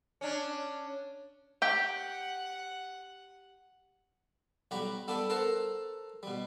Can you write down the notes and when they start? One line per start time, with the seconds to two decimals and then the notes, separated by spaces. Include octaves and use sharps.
0.21 C#4 D4
1.62 G4 F#5 G5
4.71 B1 G3 F#4 G4 A#5 B5
5.08 G3 B3 D4 G4 A4
5.30 A4 A#4 C5 F#5 A5 A#5
6.23 B2 G3